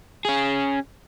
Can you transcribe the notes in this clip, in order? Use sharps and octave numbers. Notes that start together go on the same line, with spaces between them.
C#4 G#4